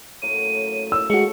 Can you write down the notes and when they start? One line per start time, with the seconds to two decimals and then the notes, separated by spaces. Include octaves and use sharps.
0.22 F#2 A2 A#3 D#7
0.92 E6
1.10 F3 G#3 A3 F#4 C#7